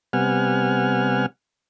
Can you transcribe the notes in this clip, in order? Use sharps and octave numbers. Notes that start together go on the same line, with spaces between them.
C3 G3 B3 F#5 G#5 F6